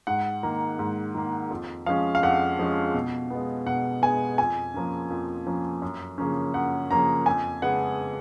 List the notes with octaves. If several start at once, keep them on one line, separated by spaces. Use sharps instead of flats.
G#2 F#5
D#3 A#3
G#2
D#3 A#3
F2
F3 G#3 C#4 F5
F5
F2 F#5
F3 G#3 C#4
B2
G#3 B3
B2 F#5
G#3 B3 G#5
F2 G#5
F3 A#3 C#4
F2
F3 A#3 C#4
F#2
C#3 F3 A#3 C#4
F#2 F#5
C#3 F3 A#3 C#4 A#5
F2 G#5
C#3 G#3 B3 F#5